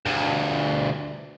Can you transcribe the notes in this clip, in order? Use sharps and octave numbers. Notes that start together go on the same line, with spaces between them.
D2 G2